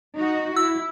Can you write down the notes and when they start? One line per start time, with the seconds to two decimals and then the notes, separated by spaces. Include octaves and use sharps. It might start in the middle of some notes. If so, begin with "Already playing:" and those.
0.17 D#4 F#4
0.57 E4 E6